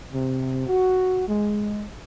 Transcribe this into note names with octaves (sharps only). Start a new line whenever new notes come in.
C3
F#4
G#3